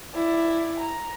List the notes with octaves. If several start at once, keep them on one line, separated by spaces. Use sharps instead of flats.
E4 D5
A#5